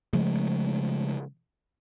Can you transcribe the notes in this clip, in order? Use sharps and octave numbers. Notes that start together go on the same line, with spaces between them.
C#3 F3 G#3 A3